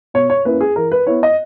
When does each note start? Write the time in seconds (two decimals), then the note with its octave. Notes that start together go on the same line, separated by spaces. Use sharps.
0.14 B2 C#5
0.30 C#5
0.45 A#3 C#4 E4 B4
0.61 G#4
0.76 E3 A#4
0.92 B4
1.07 B3 E4 C#5
1.23 D#5